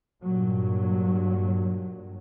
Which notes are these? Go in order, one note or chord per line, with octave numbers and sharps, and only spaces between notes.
G2 A#2 F#3